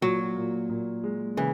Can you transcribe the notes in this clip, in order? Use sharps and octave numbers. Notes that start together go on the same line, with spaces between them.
A#2 F#3
A#2
A#2
G#3
C#3 E3